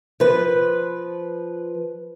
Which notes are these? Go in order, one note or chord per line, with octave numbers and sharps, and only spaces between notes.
F3 B4